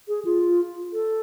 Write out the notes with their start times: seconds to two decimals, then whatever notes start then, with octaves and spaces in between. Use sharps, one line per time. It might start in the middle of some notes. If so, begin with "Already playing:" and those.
0.08 G#4
0.25 F4
0.93 A4